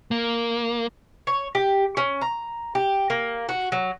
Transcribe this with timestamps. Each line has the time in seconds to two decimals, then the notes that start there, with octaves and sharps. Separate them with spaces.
0.11 A#3
1.27 C#5
1.55 G4
1.97 C#4
2.21 A#5
2.75 G4
3.10 A#3
3.49 F#4
3.72 F#3